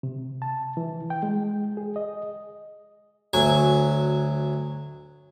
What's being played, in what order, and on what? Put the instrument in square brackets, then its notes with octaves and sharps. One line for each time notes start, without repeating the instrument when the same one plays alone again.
[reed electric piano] C3
A5
E3
G5
G#3
G#4
D#5
[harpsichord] D2 F#3 G#5 C#6